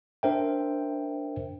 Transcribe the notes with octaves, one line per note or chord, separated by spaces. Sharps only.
D4 A#4 C5 E5 G5